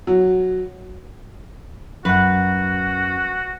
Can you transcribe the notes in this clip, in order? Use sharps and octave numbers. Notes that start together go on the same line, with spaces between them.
F#3
F#2 F#4 B4 F#5